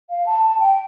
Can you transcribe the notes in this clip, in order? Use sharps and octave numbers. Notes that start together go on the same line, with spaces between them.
F5
A5
A5
G5